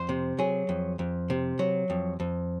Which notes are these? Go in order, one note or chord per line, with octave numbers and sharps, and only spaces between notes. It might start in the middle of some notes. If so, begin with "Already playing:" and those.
Already playing: F2 C5
C3
F#3 G#4
F2
F2
C3
F#3
F2
F2